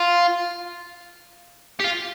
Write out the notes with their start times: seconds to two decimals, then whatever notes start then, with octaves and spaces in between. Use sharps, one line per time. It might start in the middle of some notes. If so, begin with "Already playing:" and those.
Already playing: F4
1.80 G4
1.84 F4